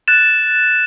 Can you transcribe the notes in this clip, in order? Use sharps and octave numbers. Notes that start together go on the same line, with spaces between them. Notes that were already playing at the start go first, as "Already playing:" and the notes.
F#6 A6 E7